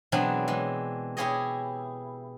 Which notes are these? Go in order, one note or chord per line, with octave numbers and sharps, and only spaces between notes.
B2 E3 F#3 G#3 C4 D4
E3 G#3
E4 G4 G#4 C#5 D#5